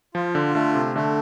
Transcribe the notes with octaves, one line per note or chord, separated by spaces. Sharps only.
F3 F4
D3
D3 A3
C3
D3 A3